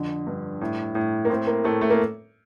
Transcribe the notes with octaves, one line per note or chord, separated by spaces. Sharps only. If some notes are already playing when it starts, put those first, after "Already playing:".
Already playing: F2 D3
G2
A2
A2
A#3
A2 C4
A#3
A2 A3
A3
A#3